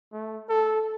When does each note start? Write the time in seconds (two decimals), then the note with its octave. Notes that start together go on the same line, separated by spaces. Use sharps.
0.13 A3
0.49 A4